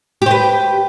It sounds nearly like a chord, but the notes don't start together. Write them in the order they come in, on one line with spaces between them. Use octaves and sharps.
G4 C5 B4